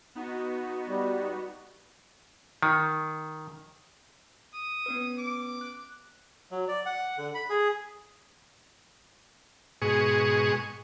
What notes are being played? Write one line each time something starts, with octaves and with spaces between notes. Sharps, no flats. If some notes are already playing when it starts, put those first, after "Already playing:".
B3 D#4 F#4
G3
D#3
D#6
B3 C#4 B4
D6
F#6
F#3
D5
F#5
D3
B5
G#4
G#2 B2 G#4 C#6